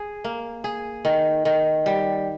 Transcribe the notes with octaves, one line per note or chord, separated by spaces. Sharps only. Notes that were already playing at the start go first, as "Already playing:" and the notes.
Already playing: G#4
A#3
G#4
D#3
D#3
G3